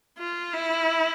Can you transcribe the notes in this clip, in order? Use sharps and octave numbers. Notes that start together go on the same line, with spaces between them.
F4
E4